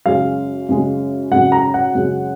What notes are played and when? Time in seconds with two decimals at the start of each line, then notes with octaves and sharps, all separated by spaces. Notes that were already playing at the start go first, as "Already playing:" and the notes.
0.06 F#2 C#3 G#3 F5
0.69 F#2 C#3 G#3
1.31 F#2 C#3 G#3 F#5
1.52 A#5
1.74 F#5
1.95 F#2 C#3 G#3